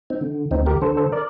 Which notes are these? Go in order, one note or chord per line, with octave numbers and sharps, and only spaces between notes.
C4 D#4
D3
D2 C4 D#4
G4 A#4
D3 A4 C5
A4 C5
A#4 D5